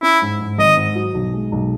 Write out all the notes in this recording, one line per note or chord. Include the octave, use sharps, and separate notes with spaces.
C#4 E4
G#2
G#2
G#1 D#5
G#2
F#3
B1
G#3
B1